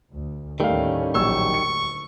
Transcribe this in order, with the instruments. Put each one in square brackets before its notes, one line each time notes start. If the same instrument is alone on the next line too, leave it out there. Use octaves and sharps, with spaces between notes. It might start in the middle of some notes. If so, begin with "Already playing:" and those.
[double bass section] D2
[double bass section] D#2 A2 C#4 [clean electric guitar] D#3 G3 [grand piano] A3 F5
[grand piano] A#1 F#3 E6 [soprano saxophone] C#6
[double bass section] D2 [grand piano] C#7